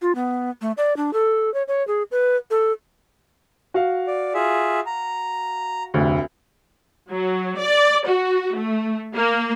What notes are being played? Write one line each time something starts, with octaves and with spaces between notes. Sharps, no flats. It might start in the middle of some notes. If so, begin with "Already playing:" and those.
F4
B3
A3
D5
D4
A4
C#5
C#5
G#4
B4
A4
F#4 F5
D5
F4 G#4 E5
A#5
F1 D2
F#3
D5
F#4
A3
A#3